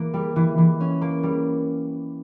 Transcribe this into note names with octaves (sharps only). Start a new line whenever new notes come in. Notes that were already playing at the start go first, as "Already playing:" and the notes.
Already playing: E3 A#3
G3
E3
E3
C#4
A#3
G3